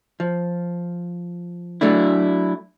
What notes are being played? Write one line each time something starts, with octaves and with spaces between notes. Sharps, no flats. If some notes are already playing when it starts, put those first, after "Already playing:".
F3
F#3 A3 D4 E4